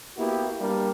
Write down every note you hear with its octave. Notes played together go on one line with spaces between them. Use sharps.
A#3 B3 E4 F#4 G4
G3 A#3 D4